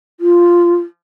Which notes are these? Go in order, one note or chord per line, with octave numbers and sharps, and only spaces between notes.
F4